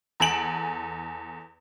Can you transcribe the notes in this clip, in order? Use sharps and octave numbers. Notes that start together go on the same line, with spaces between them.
E2 A4 G#5 D7 E7 F#7